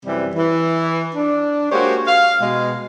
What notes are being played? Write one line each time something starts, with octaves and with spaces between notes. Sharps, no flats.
F#2 C3 E3 G3
E3
D4
G#3 A#3 F#4 G4 C5 C#5
F5
B2 G#3